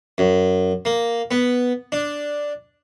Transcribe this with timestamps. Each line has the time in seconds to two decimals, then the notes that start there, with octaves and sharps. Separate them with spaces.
0.18 F#2
0.85 A#3
1.31 B3
1.92 D4